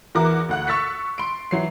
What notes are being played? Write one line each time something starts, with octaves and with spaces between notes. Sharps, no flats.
E2 E3 F#4 A#4 D6
D2 F#5 F#6
C#6 E6 A6 B6 C#7
C6 D7
E3 F#3 C7